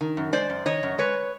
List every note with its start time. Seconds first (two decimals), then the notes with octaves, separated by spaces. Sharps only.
0.01 D#3
0.17 F#2
0.33 G#3 C5 D5
0.50 F#2
0.66 D#3 C#5 D#5
0.83 F#2
0.98 G#3 B4 C#5